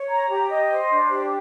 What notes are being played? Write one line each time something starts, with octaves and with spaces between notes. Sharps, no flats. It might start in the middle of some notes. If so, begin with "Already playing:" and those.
Already playing: C#5
A#5
G4
D#5
C5
D4
G4